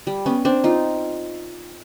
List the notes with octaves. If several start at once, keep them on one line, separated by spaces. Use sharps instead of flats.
G3
B3 C#4
C4 D4
D#4 F4